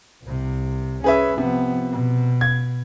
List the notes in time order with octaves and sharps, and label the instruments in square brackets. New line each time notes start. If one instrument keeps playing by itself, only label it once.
[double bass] C2 C3
[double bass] C#4 [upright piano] G#4 B4 E5
[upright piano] C3 [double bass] F3 B3
[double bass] B2
[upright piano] G#6